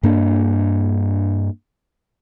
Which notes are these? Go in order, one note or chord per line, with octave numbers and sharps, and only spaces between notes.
G2 A#3 D4